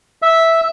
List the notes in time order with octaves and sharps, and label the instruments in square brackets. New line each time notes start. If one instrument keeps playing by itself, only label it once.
[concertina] E5